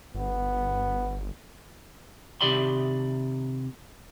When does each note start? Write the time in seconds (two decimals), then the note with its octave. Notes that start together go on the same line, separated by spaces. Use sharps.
0.15 G1 B3
2.41 C3 D#3 G4 D5 B5 C6